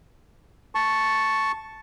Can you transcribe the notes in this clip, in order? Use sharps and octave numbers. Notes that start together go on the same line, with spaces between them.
A5 C#6